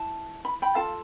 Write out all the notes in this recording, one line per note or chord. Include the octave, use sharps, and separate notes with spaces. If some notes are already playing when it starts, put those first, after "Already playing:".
Already playing: E4 A5
B5
G5 B5
F4 A4 F5 A5